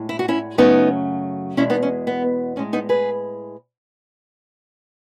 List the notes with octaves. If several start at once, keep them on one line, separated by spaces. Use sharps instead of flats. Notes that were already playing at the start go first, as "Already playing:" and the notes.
Already playing: A2 G#3
E4
F#4
C#4 E4
F#2 C#3 F#3 A3 B3 D#4
E2 B2 G#3 C#4 E4
B3 D#4
C#4
B3
A2 G#3 C#4
B3 D#4
G#4 B4